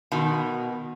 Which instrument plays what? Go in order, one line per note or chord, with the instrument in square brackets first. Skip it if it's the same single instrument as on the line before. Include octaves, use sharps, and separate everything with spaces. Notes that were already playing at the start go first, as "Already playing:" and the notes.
[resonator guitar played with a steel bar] B2 D#3